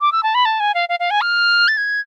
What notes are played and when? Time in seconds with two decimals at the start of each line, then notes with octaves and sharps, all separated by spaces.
0.01 D6
0.12 E6
0.23 A5
0.35 B5
0.45 A5
0.60 G#5
0.74 F5
0.89 F5
1.00 F5
1.11 G#5
1.21 F6
1.68 A6
1.77 G#6